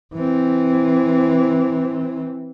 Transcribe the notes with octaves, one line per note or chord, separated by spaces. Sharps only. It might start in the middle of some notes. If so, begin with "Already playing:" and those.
E3 C4